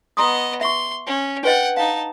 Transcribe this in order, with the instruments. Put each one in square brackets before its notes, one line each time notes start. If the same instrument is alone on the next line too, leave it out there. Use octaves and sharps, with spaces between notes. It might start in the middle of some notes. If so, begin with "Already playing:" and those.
[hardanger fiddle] B3 D#5 [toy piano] A#5 C6 D#6
[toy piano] E5 C#6 [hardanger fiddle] C6
[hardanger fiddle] C#4
[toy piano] D4 B4 D#5 [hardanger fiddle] F#5 G5
[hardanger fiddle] D#4 A5 [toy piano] F5